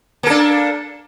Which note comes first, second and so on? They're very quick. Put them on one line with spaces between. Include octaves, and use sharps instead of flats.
A#3 A4 D4